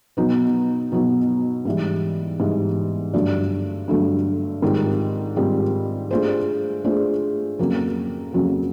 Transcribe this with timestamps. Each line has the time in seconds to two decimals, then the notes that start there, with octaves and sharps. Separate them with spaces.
0.17 B2 F#3 B3 D#4
0.92 B2 F#3 B3 D#4
1.65 G#2 E3 G3
2.40 G#2 E3 G3
3.13 G2 D3 F#3 A3 D4
3.88 G2 D3 F#3 A3 D4
4.62 G#2 D#3 G3 C4 F4
5.36 G#2 D#3 G3 C4 F4
6.11 A3 D4 F4 G#4 C5
6.84 A3 D4 F4 G#4 C5
7.59 F2 C#3 F#3 A#3
8.33 F2 C#3 F#3 A#3